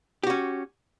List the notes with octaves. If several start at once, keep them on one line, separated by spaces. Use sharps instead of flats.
C#4 F#4 G4